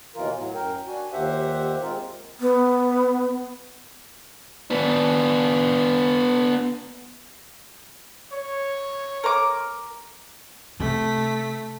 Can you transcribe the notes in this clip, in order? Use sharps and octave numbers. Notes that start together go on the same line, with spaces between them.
D#2 B2 E3 F4 A#4
A2 F#3
F#2 A#4 G5
D4 F#4 G#5
D#2 A#2 G4 C5 E5 F#5
G#3 C4 F4 A#4
B3
B3 D4
C#5
A#4 D6
C3 A3 B6